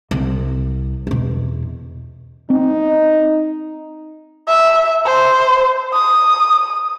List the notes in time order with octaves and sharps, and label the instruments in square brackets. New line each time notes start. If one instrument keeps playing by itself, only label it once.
[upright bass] C2
E2 B2
[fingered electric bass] C4 [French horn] D#4
[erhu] E5
C5
D#6